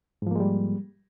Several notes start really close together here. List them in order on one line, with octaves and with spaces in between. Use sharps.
G#2 F3 A#3 G#3 G3